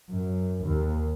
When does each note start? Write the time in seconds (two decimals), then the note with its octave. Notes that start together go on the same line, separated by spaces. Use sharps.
0.10 F#2
0.65 D#2